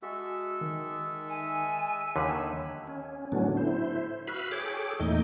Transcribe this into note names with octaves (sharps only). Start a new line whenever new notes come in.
G#3 F#4 A4 E5
D#3
G#5
D#2 D3 D#3 C#5 E5 B5
C#4
A2 D3 F#3 B3 C#4 D4
E4 C5
F#4 B4 E5 F5 B5
G#4 A4 C#5 G5 D6
E2 A#2 A3 D#4 D#5 G6